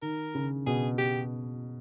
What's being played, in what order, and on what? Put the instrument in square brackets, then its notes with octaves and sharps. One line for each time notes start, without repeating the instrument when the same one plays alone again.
[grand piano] D#3 [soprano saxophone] A#4
[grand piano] C#3
[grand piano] B2 [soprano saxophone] G#4
[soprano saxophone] G4